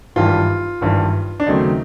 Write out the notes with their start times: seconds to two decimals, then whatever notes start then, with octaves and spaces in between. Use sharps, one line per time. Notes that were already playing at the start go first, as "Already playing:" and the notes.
0.16 G#1 G2 E3 G3 F4
0.81 G#1 G2 E3 G3
1.40 D4
1.46 D#2 C#3 F#3 A3 C4 D#4